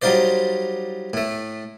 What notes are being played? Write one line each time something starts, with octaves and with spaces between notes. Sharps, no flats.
F#3 G3 D#4 F4 C5 D5
A2 A3